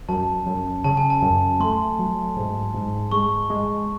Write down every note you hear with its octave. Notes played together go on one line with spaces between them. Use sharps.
F#2 A5
F#2
C#3 A5
G#5
A5
F#2
A3 C6
F#3
G#2
G#2
G#3 C#6
G#3